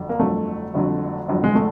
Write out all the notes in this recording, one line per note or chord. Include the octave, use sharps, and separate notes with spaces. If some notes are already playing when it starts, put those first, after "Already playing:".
Already playing: G1 F2 D3 F#3
A#3
G1 F2 D3 F#3 A3
G1 F2 D3 F#3
G1 F2 D3 F#3
G#3
A3